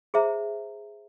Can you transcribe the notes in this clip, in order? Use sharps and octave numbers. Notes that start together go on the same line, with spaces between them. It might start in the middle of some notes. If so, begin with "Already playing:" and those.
G#4 C5 E5 A#5